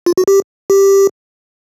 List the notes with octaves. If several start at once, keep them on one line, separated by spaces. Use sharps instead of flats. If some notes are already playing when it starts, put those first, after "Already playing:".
F4
F#4
G4
G4